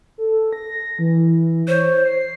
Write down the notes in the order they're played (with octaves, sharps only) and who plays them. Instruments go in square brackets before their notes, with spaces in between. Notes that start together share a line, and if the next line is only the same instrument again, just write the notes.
[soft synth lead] A4
A#6
E3
[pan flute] C5 [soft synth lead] C#5
[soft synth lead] C7